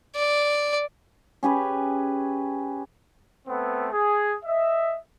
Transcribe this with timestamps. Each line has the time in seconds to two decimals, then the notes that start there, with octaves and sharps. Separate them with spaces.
0.16 D5
1.43 C#4 G4 G#4 B4
3.48 A3 B3 C4
3.93 G#4
4.44 D#5 E5